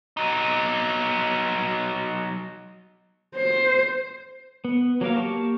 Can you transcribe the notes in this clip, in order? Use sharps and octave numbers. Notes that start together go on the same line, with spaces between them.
F#3 D#4
C5
B3
F#3 A#3 A#4 F5
A#3 G4 A5 C#6 D6